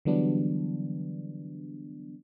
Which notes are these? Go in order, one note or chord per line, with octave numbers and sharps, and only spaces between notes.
D3 E3 F#3 G3 B3 D4